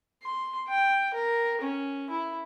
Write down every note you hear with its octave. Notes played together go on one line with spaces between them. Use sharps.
C6
G5
A#4
C#4
E4